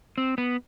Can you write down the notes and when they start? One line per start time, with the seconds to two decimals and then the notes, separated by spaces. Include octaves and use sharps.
0.18 C4
0.38 B3